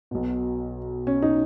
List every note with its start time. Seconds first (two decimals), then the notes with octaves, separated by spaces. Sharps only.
0.11 B1 B2
1.07 C#4
1.22 D#4